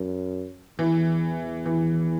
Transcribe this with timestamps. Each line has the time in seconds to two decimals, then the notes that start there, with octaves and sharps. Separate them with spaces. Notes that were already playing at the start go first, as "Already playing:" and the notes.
Already playing: F#2
0.79 E2 E3
1.66 E3